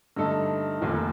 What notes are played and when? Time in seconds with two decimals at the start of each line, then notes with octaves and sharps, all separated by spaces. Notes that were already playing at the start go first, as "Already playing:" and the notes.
0.16 G2 D3 A3 D#4 A4
0.81 F1 D#2 D#3